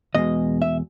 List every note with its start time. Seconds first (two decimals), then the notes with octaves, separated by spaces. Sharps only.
0.15 E2 B2 G#3 D#5
0.62 E5